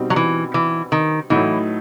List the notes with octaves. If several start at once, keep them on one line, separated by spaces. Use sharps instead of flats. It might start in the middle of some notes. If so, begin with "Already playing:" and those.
Already playing: B2 G3 C4 D#4
F#3
E3
E3
D#3
A2 E3 F#3 A3 D#4